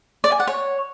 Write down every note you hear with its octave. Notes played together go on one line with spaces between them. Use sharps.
D5
G#5
F#5
C#5